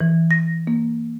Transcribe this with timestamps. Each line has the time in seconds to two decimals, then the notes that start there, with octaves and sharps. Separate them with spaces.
0.01 E3
0.31 A#6
0.67 A#3